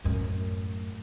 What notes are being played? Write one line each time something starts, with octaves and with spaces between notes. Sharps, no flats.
F#2 A2